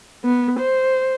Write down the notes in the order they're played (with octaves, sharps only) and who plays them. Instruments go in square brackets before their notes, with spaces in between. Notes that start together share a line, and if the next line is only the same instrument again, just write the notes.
[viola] B3
C5